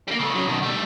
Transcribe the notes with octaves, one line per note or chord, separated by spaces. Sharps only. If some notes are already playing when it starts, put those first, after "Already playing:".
G3 A#3
C#3 A3
C#3 F#3
B2 D#3
G3 A3